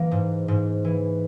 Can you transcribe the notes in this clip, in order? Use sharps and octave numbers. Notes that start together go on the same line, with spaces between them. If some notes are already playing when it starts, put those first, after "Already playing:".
Already playing: E3 A#3
G#2
G#2
E3